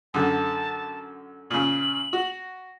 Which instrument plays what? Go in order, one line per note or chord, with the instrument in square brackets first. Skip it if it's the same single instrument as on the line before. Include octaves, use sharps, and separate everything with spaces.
[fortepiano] F#2 D3 [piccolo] A5
[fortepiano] A#2 C#3 [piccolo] F#7
[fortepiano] F#4